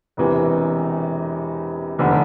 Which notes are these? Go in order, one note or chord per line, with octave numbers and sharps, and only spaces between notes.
E1 E2 C3 E3
F1 E2 D3